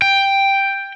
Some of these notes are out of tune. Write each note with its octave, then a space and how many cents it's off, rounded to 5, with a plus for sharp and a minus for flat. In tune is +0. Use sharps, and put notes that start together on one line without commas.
G5 +5